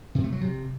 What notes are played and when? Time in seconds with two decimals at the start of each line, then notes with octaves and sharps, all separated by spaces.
0.15 C3
0.24 A3
0.32 F#3
0.41 C3